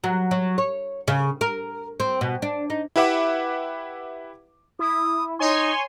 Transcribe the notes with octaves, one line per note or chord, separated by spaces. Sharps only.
F#3
F#3
C#5
C#3
A#4
C4
B2
D4
D#4
E4 G4 B4 E5 F#5 D6
E4 D#6
D#4 C#5 G#5 C6